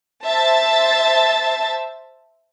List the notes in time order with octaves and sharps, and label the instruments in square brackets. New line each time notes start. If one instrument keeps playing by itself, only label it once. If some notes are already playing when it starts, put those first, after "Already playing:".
[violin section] C5 E5 A5 A6